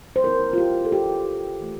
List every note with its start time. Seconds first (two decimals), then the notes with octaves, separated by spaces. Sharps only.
0.16 C5
0.24 F3 C4 E4 A#4
0.53 F4
0.58 G4
0.85 A4
0.92 G4
1.60 E3 A3